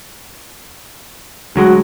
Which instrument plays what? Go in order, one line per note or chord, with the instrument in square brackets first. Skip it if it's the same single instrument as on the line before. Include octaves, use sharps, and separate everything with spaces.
[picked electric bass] D2 F#3 G#3 [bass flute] F#4